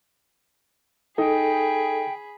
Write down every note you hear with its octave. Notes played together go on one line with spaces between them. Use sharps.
D#4 G#4 A4 G5 B5